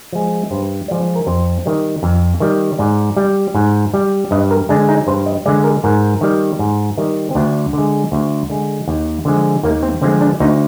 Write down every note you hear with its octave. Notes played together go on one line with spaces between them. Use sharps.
F3 G#3
G2 C5
F3 G#3 D5
A#4
F2 C5
D#3 G3
F2
D#3 G3
G#2 D5
G3
G#2
G3
G2 D#5
A#4
D3 G#3 D4
D#4
G2 C5
D#5
D3 G#3 D5
A#4
G#2 A#4
D#3 G3
G#2
D#3 G3
C4
D2 D4
D3 G#3
D2
D3 G#3
D#2
D3 F3 G#3
D#2 A#3
C4
D3 F3 G#3 C4
D4
D2 D#4